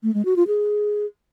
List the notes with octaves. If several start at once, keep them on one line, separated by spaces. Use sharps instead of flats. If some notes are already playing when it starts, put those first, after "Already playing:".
A3
G#3
F#4
F4
G#4